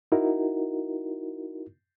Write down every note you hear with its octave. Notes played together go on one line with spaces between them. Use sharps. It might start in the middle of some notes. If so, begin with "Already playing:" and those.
D#4 E4 F#4 A#4